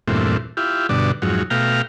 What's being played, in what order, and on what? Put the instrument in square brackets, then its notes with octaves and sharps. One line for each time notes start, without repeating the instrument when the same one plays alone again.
[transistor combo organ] E2 G2 A#2 A3 C4
E4 F4 G4
G2 B2 D3 D4
F2 G#2 F#3
B2 A3 F5 G5 A#5